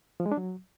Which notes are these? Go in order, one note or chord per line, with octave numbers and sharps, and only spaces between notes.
F3
G#3
D4
F#3